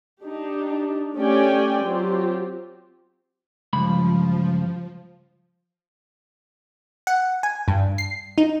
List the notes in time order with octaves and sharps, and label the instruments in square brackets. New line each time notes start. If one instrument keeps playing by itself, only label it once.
[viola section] D4 D#4 G4
A3 C#4 G4 D5 G5 G#5
F#3 C4 F4 G4
[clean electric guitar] C#2 G2 B5 [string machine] F3
[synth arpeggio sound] F#5
G#5
G2
C7
D#4